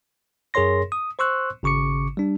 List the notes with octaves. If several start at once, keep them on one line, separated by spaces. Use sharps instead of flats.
F#2 G#4 A#4 C#5 C6 A#6
D#6
C5 C6 C#6 E6 F#6
G#1 C#3 C#6 D6 C#7
G3 D4